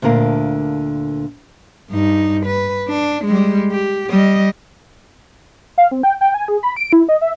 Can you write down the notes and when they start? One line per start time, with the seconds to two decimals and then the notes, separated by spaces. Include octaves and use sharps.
0.02 D2 A#2 D3 A#4 F5
1.91 G2 D#4
2.46 B4
2.88 D4
3.25 G3 G#3
3.71 G4
4.10 G3 D#5
5.78 F5
5.91 C4
6.03 G5
6.21 G5
6.34 G#5
6.48 G#4
6.63 B5
6.76 D7
6.93 E4
7.09 D#5
7.21 E5